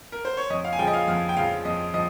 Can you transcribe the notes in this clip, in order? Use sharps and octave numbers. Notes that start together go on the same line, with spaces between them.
A#4
C5
C#5
F2 D#5
F5
G#5
C#3 F3 G5
D#5
F5
F2 F5
G5
C#3 F3 F5
F2 D#5
F3 D#5